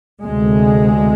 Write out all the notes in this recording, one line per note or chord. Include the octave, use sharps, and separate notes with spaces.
D2 C3 G#3